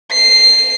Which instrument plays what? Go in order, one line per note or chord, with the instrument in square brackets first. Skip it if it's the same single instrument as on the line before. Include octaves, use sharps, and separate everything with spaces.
[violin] C7